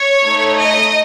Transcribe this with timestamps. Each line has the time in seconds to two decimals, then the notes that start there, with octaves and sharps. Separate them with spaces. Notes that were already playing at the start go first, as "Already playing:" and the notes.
Already playing: C#5
0.24 A3 D#4 A4
0.57 D#5